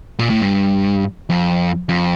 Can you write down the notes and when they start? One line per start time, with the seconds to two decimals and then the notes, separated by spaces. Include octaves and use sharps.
0.19 A#2
0.30 A2
0.42 G2
1.30 F2
1.89 F2